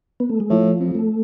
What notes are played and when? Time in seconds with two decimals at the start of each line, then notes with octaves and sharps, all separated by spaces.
0.20 B3
0.29 A3
0.40 G#3
0.50 A2 F3
0.80 F2
0.95 A3